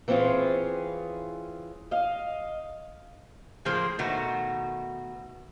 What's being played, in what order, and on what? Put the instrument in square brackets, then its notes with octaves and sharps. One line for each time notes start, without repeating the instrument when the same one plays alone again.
[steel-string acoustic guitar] E3 C4 C#4 F4 G#4
D#5 F5
[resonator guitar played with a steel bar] A2 F3 A#3 G#4 C5
B2 D#3 A3 F#4